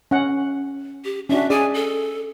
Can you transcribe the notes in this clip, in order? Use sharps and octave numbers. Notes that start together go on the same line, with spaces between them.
C#4 F#5
G4
C#4 D4 F#4 E5
G#4 D5 G#5
A4